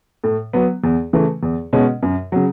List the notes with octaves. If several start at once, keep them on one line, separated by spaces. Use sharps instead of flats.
A2
F#3 B3
E2
C#3 E3 A3
E2
B2 G#3 C#4
F#2
C#3 F#3